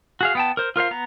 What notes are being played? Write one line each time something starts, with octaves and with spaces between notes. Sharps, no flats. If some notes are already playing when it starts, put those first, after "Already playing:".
F#4 G#4 F5
B3 G5 A5
A#4 C5
F4 A#4 C5 F5
B3 A#5